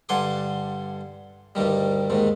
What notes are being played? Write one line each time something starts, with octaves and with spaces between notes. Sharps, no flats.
G2 D3 F#5 G#5 C6 D6
D2 G2 D#3 G3
D#2 G#2 D#3